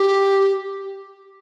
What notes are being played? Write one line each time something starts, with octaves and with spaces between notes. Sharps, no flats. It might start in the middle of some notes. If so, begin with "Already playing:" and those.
Already playing: G4